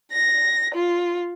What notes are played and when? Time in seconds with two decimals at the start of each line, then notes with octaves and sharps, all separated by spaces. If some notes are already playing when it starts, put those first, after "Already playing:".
0.12 A#6
0.74 F4